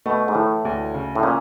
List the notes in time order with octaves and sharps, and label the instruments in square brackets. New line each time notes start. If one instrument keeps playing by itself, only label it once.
[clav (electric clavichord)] B2 [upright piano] A3
[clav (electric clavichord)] G#2
[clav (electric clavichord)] A2 [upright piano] E3
[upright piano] D2
C#3
[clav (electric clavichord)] A2
[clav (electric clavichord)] A#2 [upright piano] C#4